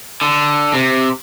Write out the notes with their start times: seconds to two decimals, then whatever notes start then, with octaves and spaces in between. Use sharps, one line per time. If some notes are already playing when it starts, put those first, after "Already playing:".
0.21 D3
0.73 C3